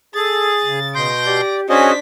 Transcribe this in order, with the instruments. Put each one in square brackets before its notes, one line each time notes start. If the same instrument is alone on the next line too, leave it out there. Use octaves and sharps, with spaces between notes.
[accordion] G#4 [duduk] A4 [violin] A6
[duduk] C#3
[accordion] B2 C6 G6 [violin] A#6 D7
[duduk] G4 [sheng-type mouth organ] D5
[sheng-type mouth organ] C#4 G#4 D#5 [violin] D4 B6 [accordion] F#4 [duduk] C5